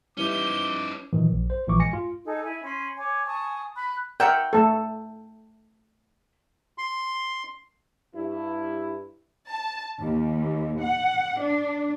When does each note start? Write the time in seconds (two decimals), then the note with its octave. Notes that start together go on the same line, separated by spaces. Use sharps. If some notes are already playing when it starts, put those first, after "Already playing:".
0.17 G3 C#4 D#4 E4 B4 D6 G7
1.13 A#2 D#3 E3 F#3
1.31 A#1
1.50 C5
1.68 A#1 A#2 E3 F3 C#6 D6
1.79 G#3 G#5 A#6 C#7
1.93 F4
2.24 D#4 G#4 A4
2.43 E4 G#5
2.63 C#4 B5 C6
2.97 C#5 G#5 D6
3.26 G#5 A5 C#6 D#6
3.76 B5 F#6
4.20 A#4 E5 F#5 G5
4.53 A3 A4
6.78 C6
8.14 G2 E4
9.50 A5
10.01 D#2
10.80 F#5
11.38 D4